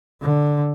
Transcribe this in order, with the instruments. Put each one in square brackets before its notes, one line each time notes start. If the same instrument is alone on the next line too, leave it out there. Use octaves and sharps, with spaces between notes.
[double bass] D3